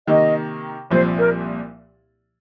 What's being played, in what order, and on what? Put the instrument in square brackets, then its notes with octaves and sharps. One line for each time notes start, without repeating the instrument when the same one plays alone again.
[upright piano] C3 D#3 A#3 [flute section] D#5
[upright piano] C2 A#2 F3 C4 [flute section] C5
[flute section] A#4